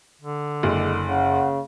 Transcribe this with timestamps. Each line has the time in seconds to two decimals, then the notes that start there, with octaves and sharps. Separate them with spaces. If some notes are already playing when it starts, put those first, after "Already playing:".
0.21 D3
0.63 F#1 G#3
1.09 C#3 F#5